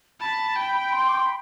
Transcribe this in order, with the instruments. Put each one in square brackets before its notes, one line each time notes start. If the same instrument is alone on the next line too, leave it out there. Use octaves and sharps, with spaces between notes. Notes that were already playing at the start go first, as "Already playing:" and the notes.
[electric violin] A5 [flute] B5
[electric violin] G5
[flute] C6
D6
C6
B5